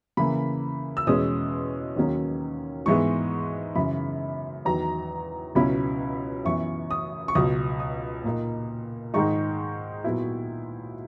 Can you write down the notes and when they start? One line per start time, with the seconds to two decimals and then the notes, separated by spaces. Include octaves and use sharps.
0.17 C#3 E3 A#3 B5
0.97 E6
1.07 E2 B2 G#3 C#4 D#6
1.96 D#2 D#3 F#3 A#3 C#4
2.86 G#2 E3 G#3 B3 C#6
3.75 F#2 C#3 E3 B5
4.65 E2 D#3 F#3 A#5
5.55 C#2 B2 F#3 C#4 E4 B5
6.45 F#2 E3 B3 C#6
6.91 D#6
7.28 C#6
7.35 C#2 B2 F#3 D#6
7.80 D#6
8.24 A#2 A#3 D#4
9.14 G#2 D#3 G#3 D#4 C#6
10.04 A#2 F#3 B3 E4